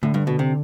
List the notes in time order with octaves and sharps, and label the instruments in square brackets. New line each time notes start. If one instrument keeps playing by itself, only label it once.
[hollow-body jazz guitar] A2 [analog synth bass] D3
[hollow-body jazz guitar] G2
B2
C3